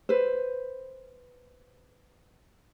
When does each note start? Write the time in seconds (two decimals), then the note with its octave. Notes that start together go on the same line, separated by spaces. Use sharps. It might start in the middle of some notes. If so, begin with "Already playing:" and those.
0.09 B4 C5